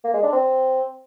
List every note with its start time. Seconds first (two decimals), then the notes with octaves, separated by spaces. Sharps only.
0.04 A#3
0.14 G#3
0.23 D4
0.32 C4